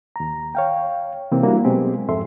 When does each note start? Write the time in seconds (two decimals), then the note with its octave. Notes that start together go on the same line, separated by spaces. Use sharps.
0.16 D#2 A#5
0.55 C#5 F5 G5
1.32 C3 E3 A#3 C4
1.43 G3 A#3 D4 E4 F#4
1.65 B2 F#3 G#3 C4 G4 G#4
2.09 F2 G#2 A4 E5 C6